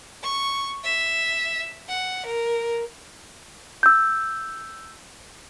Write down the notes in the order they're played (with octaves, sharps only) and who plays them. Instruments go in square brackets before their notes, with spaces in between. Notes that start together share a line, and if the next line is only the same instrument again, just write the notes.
[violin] C#6
E5
F#5
A#4
[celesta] E6 G6